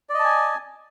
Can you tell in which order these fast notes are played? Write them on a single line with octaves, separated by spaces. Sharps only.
D5 D#5 A5 G#5